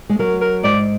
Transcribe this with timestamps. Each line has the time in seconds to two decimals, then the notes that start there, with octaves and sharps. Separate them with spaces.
0.09 G#3
0.19 F#3 A#4
0.41 A#4
0.63 G#2 D5